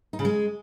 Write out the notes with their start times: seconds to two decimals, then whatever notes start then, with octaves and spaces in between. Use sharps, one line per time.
0.13 D#4
0.19 C#3
0.25 G#3